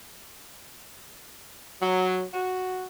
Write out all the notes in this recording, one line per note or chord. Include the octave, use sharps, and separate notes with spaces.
F#3
F#4